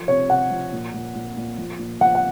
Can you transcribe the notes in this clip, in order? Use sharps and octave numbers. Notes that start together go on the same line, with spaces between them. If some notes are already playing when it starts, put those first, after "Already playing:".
Already playing: F3
C3 C#5
C3 F#5
F3
A#2
A#2
A#2
A#2
F3
A#2
F3 F#5
F#5